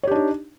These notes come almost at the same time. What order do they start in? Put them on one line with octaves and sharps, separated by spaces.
C#5 G4 D4 D#4